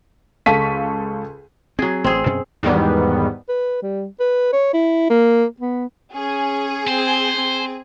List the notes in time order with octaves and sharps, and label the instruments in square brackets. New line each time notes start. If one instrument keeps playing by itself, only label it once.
[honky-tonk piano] C#2 A4 F5 C#6 B6 D#7
[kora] F#3 G#4 [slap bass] C4
[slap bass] A1 [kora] C4 G#4
[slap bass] F#2 B2 C#4
[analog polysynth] E2 G#2 D#3 G3 B3
[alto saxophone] B4
G3
B4
C#5
E4
A#3
B3
[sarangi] C#4 [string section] G#4
[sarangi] C4 [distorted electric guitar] C5
[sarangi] C4